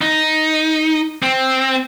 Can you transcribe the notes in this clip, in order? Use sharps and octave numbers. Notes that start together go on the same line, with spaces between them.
D#4
C4